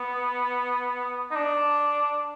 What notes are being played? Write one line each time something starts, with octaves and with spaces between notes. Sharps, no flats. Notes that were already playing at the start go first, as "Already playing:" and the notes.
Already playing: B3
D#4
D4